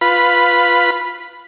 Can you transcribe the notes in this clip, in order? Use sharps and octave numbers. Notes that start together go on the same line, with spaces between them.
F4 B4 B5